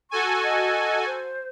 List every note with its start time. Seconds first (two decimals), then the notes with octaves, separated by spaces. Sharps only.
0.11 F#4 A4 G#5 C#6
0.44 D#5
1.06 C5